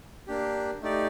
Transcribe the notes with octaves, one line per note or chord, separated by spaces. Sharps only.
A#3 D4 G4
A3 D#4 G4 D5